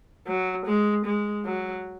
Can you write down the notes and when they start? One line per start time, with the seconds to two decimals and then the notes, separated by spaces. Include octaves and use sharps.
0.27 F#3
0.66 G#3
1.05 G#3
1.45 F#3